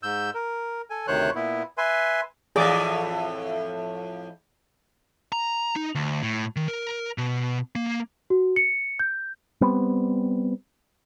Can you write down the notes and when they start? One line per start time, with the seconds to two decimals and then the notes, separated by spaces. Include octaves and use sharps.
0.03 G#2 E6 G6
0.34 A#4
0.90 A4 G#5
1.07 D2 C3 D#3 C5 C#5 F#6
1.35 A#2 B3 E4
1.78 B4 E5 G#5 C6
2.56 F2 A2 E3 G#4 D5 D6
5.32 A#5
5.76 D#4
5.95 D2
6.23 A2
6.56 D#3
6.68 A#4
7.18 B2
7.75 A#3
8.30 F#4
8.56 C#7
8.99 G6
9.61 G3 B3 C4